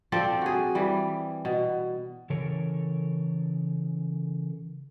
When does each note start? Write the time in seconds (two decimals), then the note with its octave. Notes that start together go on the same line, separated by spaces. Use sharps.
0.12 F3 C4 A4 D5
0.41 F#4 G#4
0.75 E3 G3
1.45 B2
2.30 C#3 E3 A4 A#4 C#5